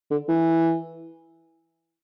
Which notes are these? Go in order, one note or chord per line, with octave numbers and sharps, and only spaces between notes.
D3
E3